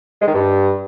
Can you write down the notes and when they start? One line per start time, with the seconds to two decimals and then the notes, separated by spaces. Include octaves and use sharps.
0.21 G#3
0.27 D#3
0.33 G2